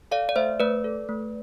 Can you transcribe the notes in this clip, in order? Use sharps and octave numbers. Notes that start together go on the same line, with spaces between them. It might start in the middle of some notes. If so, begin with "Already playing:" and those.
A4 D5 F5
D5
A3 C5 E5
A3 B4 D5
A4
A3